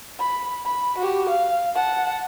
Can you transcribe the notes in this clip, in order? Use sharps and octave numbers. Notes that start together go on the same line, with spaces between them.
B5
B5
F#4 G4
F5
F#5 A5